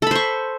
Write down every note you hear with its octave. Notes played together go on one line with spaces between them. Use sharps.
A4 C5 B5 C#6